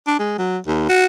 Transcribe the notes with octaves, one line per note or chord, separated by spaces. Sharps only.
D4
G#3
F#3
D#2
F#4